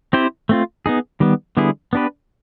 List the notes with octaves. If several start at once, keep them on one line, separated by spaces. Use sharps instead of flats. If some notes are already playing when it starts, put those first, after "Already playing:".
C4 E4 G4 C5
A3 C4 F4
B3 D#4 G#4
D#3 G3 B3
D3 G3 B3 E4 G#4
B3 D4 G4 B4